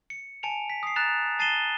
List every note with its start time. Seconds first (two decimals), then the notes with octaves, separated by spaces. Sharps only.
0.10 C#7
0.43 G#5 A5 C#7 D7 F7
0.70 B6
0.83 D#6 C7
0.96 A#5 F#6 A6 E7 F7
1.39 A5 A6 C7 D#7 E7 G7